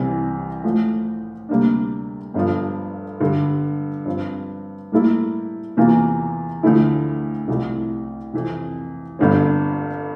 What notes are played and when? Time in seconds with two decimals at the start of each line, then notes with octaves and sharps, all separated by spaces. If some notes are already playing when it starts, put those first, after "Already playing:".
Already playing: C2 C3 E3 G3 C4
0.64 A1 A2 F3
1.49 D2 C3 G3 A#3 D4
2.34 G1 G2 F3
3.20 G2 D3 G3
4.05 G2 F3 C4
4.92 A2 G3 A#3 E4 A4
5.77 E2 C3 E3 A#3 F4
6.63 D2 D3 F3 A3 E4
7.48 C2 C3 F3 A3 E4
8.33 F2 C3 E3
9.19 G1 G2 D3 G3 C4